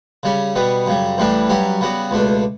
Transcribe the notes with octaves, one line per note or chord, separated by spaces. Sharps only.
C#3 G3 C#4
B2 G3 B3
F#2 C#3 G3
A1 A2 E3 G3 D4
G2 F#3 C#4 G4
C#3 G3 B3 F#4
C#2 B2 A3 D4